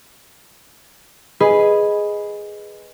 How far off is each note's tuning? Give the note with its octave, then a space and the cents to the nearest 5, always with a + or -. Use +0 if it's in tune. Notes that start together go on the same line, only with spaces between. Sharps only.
G#4 +0 B4 +0 D#5 +0